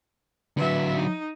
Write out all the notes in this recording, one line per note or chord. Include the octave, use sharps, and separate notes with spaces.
D3 F#3 B4 E5
D#4